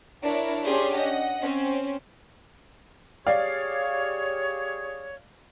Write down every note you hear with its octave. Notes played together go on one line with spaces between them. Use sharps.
D4 E4 A#4 C#5
C#4 D4 G4 G#4 C6
D#5 F#5
C4 C#4
G4 G#4 C#5 D5 F5